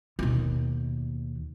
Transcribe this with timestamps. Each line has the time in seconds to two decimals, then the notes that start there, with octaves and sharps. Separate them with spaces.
0.19 D#2 B2